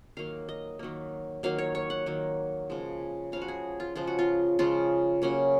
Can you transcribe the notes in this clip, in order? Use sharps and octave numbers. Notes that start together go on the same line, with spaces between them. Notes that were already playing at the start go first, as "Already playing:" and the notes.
D#3 F#3 A#3 F5
D#5
D#3 F#3 A#3
D#3 F#3 A#3 F5
C#5
C#5
F#5
D#3 F#3 A#3
C#3 F3 G#3
C#3 F3 G#3 F5
F#4
G#4
F4
C#3 F3 G#3 F4
F#4
F4
C#3 F3 G#3 F4
C#3 F#3 A#3 C#4